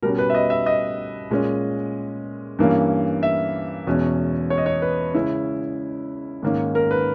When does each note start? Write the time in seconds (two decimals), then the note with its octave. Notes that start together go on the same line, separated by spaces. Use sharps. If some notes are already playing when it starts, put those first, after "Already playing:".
0.02 B2 G3 C#4 A#4
0.18 B4
0.30 E5
0.35 D#5
0.50 E5
0.66 D#5
1.31 A#2 G#3 C#4
2.59 G2 E3 A#3 C#4
3.23 E5
3.87 E2 B2 G#3 C#4
4.50 C#5
4.58 D#5
4.66 C#5
4.82 B4
5.14 C#3 G#3 C#4 E4
6.43 G#2 D#3 A#3 C#4
6.75 A#4
6.91 B4